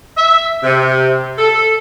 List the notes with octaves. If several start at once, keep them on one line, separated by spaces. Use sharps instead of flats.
E5
C3
A4